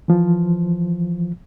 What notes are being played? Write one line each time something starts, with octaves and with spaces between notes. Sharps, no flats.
E3 F3